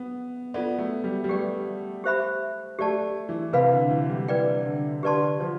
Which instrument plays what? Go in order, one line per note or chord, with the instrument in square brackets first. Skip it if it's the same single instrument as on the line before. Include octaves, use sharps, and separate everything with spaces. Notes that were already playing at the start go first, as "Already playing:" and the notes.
Already playing: [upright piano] B3
[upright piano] B3 [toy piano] F4 A4 D5
[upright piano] A3
G3
G3
[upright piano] A3 [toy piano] G4 B4 D5 G5
[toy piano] G4 C5 E5 B5
[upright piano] A3 [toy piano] G4 D5 A5
[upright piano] E3
[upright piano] C3 [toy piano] B4 F5 B5
[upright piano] D3
E3
G3
[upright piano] E3 [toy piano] B4 D5 G5
[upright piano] D3
[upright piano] D3 [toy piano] G4 B4 D5 A5 C6
[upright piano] F3